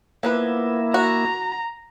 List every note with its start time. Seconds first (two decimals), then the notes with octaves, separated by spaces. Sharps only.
0.23 F3 A#3 B3 E4 B4
0.94 F#4 A#5